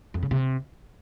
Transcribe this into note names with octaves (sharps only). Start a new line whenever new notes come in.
F2
C#3
C3